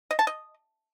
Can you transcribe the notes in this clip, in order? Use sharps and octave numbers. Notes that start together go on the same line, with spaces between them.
D#5
A5
D#5